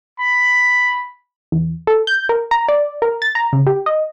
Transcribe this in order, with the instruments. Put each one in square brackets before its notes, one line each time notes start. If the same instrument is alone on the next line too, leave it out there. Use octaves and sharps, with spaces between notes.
[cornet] B5
[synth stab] E2
A4
G6
A#4
A#5
D5
A#4
A6
A#5
C#3
G4
D#5